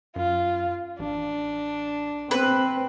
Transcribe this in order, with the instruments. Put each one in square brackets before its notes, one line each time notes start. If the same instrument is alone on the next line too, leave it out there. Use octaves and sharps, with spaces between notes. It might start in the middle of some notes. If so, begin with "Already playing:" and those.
[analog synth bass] F#2 [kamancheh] F4
[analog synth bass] A1 [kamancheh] D4
[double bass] C4 [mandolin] B4